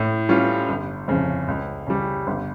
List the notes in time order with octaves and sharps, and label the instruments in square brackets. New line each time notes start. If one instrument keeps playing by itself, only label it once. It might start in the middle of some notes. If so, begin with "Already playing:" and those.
Already playing: [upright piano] A2
G3 C#4 F4
G1
F2 C#3
C#2
C#3 G3
G1